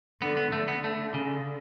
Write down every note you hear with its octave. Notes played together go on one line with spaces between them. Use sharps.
D3 B3
B3
D3 A3
B3
A3
C#3